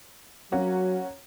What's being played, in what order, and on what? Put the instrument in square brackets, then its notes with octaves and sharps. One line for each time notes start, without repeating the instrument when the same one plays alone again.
[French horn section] F#3 [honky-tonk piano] A#3 C#4 F#4